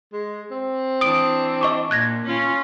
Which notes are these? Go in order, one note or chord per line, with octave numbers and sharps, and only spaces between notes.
G#3
C4
E3 D4 D#6 D7
D#5 C#6 D6
A#2 F#6 G#6 A#6
C#4 F4